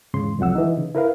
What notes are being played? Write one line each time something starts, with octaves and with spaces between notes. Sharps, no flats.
E2 G#2 C#3 C6
C2 F2 F#3 F#5 E6
E3 D#4
C#3
E4 A#4 B4 F5